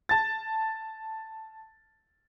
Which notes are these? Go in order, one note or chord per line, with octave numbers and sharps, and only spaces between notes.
A5 A6